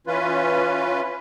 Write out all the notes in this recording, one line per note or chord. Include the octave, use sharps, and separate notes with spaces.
E3 C#4 F4 B4